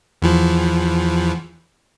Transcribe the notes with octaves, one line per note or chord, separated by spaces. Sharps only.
E2 E3 F3